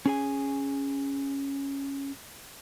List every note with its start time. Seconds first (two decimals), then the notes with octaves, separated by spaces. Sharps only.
0.06 C#4 G#4 G#5